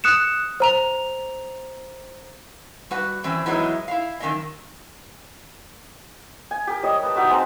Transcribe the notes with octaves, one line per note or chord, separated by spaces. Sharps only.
D#6 F#6 C#7 E7
C5 A#5 F7
G3 F#4 B4 F#5
D3 E3 C4 C#4
E3 F#3 G#3 B3 D#4 E4
E4 F5
F#2 D#3 G3 C#4 D4 D#5
G#5
G4 A#4
G3 C#5 D#5
B4 A5
D#4 F#4 E5 C#6
G#3 C4 A5 A#5